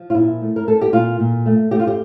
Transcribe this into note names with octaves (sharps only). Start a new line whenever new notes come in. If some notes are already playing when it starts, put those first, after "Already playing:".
Already playing: F3
F4
A#2 E4
A3
A#4
A3 A4
G4
A#2 F4
A#2
A3
A3 G4
F4
G4